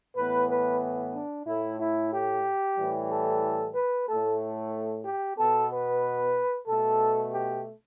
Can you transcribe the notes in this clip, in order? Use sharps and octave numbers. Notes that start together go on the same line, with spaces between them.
A2 E3 B3 B4
B4
D4
A2 A3 E4
E4
G4
A2 E3 G3
A4
B4
A2 A3 A4
G4
B2 B3 A4
B4
B2 A3 A4
G4